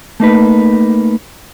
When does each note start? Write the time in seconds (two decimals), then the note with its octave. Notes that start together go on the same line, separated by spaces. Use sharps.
0.20 A3 A#3 D#4 B4